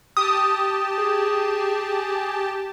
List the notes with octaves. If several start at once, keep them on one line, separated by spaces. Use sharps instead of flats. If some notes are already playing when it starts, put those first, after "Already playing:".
G4 A5 D#6
G#4